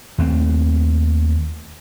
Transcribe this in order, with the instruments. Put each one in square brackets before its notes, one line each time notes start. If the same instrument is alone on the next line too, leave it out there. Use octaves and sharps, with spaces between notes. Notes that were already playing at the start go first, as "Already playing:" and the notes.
[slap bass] D#2 A3 C4